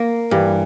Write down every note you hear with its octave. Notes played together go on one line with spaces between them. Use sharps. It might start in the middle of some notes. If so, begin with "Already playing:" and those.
Already playing: A#3
G2 E3 G3